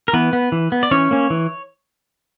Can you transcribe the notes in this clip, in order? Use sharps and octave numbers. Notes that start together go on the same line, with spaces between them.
A#4
E3 B3 B4
B3
E3
B3
D5
E3 C#4 C#5
A#3 C#4
E3